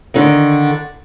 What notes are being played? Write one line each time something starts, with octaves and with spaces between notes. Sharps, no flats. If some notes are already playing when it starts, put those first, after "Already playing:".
D3 D#3